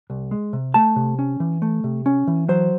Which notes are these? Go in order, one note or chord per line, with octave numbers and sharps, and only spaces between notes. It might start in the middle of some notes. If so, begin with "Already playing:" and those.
C2
G#3
C3
A3 A5
C3
C#4
E3
A3
C3
C#4
E3
F#3 C5